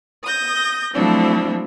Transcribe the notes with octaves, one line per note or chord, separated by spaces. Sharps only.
D#6 G6 A#6
F3 F#3 A3 C4 D4 E4